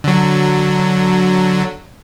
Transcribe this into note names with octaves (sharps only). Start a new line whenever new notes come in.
D3 F#3